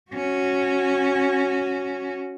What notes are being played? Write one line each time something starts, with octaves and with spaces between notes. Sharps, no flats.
C#4 F#4